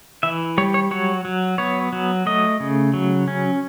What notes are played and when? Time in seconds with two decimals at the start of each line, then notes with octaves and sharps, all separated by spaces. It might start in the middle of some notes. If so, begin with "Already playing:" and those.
0.23 E3 E5
0.58 G3 C#5
0.74 C#5
0.91 F#3 C#5
1.25 F#3
1.58 B3 C#5
1.93 F#3
2.26 A3 D#5
2.60 C#3
2.94 F#3
3.28 C#4